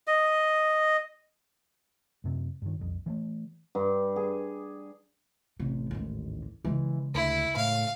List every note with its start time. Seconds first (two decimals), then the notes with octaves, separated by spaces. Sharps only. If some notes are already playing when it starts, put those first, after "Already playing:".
0.07 D#5
2.24 F#2 C3
2.62 G2 D#3
2.78 B1 F2
3.06 E3 G#3 A3
3.75 G2
4.16 G#4
5.59 A1 C3
5.91 D#2 G#2
6.65 C#3 E3 G#3
7.15 D2 E4
7.56 A2 F5